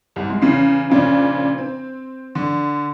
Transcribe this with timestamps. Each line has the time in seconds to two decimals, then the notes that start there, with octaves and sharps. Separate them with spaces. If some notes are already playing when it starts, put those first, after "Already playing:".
0.16 C2
0.30 G#3
0.42 E2 C#3 C7
0.90 F2 A#2 C#3 D4
1.58 C4
2.35 D3